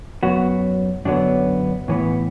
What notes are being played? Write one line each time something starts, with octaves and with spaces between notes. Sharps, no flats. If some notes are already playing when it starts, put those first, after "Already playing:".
F#2 F#3 B3 F#4
F#2 D3 F#3 B3 D4
A2 E3 B3